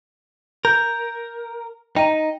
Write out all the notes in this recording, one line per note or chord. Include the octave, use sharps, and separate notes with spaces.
A#4 G6
D#4 G5 A#5 D#7